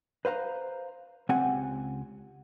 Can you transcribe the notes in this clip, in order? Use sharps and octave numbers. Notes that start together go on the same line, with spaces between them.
B4 C5 F5 A#5
C#2 C4 G4 F#5 G#5